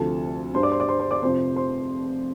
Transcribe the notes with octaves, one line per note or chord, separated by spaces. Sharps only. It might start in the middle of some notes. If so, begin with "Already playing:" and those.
Already playing: D2 C3 F3 A4 A5
G2 G3 D4 C5 C6
D5 D6
C5 C6
D5 D6
C5 C6
C5 C6
D5 D6
F1 F2 C3 F3 C4 C5 C6
C5 C6